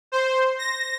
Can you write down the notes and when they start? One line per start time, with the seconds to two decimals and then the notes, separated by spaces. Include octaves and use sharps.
0.12 C5
0.59 A#6